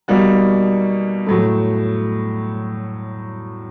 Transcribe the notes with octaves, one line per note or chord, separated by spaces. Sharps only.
B2 G3 A#3 D#4 F#4
A2 F#3 A3